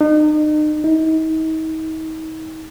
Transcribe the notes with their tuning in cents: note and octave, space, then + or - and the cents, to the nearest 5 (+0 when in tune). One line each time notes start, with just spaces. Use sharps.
D#4 -35
D#4 +40